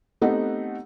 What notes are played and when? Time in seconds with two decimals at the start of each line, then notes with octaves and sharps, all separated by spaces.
0.22 A3 B3 C4 D#4 G4 F#5